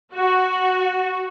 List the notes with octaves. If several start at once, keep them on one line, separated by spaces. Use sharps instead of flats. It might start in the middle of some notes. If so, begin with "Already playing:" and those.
F#4